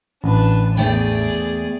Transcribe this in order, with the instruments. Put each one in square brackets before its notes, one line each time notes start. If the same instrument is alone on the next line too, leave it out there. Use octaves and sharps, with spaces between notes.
[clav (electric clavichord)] A1 [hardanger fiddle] D4 B4
[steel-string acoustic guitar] E2 A3 G5 [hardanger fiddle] G#4 D5